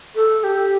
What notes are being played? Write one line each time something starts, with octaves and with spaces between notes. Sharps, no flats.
A4
G4